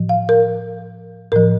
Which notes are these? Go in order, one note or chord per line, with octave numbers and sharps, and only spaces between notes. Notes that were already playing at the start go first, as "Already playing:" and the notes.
Already playing: A2 F3
F5
A#4
A2 F3 A#4